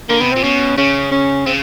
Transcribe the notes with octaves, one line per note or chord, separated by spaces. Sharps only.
D3 A#3
C3 B3
A#2 C4
B2 C#4
C#3 C#4
C#4
C#3 C4